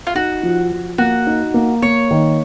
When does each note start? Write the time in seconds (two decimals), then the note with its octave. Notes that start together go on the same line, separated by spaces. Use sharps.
0.07 F4
0.15 D#4 F#4
0.43 F3
0.72 F3
0.98 A#3 F#4
1.27 D#4
1.54 A#3
1.82 A#3 C#5
2.11 D#3